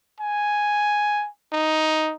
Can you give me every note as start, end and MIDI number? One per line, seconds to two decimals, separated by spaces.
0.20 1.28 80
1.52 2.13 63